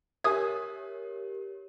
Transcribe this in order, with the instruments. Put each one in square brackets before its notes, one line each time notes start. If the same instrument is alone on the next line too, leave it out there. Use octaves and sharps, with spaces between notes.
[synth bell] G4 A#4 C#5 [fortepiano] E5 G#5 [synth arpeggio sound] D#6 G#6